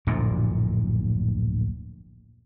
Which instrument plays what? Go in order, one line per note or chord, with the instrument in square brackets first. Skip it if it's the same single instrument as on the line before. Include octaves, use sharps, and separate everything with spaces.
[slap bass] D1 A#1 F#2 A#2